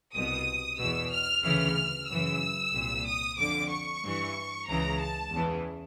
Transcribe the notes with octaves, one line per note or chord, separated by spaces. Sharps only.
C2 B2 D#6
E2 B2 E6
F6
D2 C#3 E3 F6
F#2 C#3 E3 E6
C2 A#2
D#6
F2 D3 D6
C#6
G2 E3
C#2 C#3 E3 A#5
A5
E2 C#3 E3